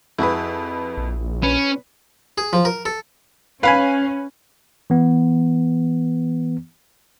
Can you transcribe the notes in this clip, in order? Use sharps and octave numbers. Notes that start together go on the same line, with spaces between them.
F2 E4 F#4 G#4 B4
A#1
C#4 B4
G#4
F3
A#4
A4
C#4 B4 F5 G#5 B5
E3 B3